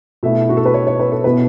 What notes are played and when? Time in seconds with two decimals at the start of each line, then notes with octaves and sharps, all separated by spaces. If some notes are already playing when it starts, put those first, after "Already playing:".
0.23 B2 A3 E4 E5
0.49 F#4
0.57 A4
0.65 B4
0.74 C#5
0.87 C#5
0.99 B4
1.12 A4
1.24 B2 B3 E4 B4